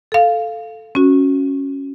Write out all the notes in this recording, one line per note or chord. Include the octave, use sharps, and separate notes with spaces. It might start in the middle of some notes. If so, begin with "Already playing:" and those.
A4 F5
C#4 F#4